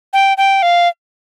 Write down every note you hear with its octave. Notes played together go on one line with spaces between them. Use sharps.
G5
G5
F5